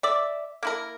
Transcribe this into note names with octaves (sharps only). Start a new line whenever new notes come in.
D5 E5
A#3 E4 A#4